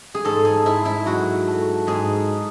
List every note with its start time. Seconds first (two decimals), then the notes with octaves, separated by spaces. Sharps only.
0.15 G#4
0.25 G#2 A4
0.45 G#4
0.65 G#2 E4
0.85 E4
1.06 F#3 F#4
1.47 A3
1.87 G#2 G#4